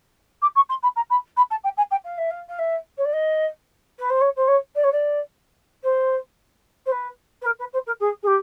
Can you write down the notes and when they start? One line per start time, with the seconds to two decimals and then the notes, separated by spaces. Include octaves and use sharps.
0.42 D6
0.56 C#6
0.69 C6
0.83 B5
0.96 A#5
1.10 B5
1.37 B5
1.51 A5
1.64 G5
1.77 G#5
1.91 G5
2.04 F5
2.18 E5
2.31 F5
2.49 F5
2.59 E5
2.98 C#5
3.05 D5
3.13 D#5
3.99 B4
4.10 C5
4.21 C#5
4.36 C5
4.48 C#5
4.75 D5
4.84 C#5
4.92 D5
5.84 C5
6.86 C5
6.92 B4
7.42 B4
7.46 A#4
7.59 B4
7.73 C5
7.87 A#4
8.00 G#4
8.23 G#4
8.27 G4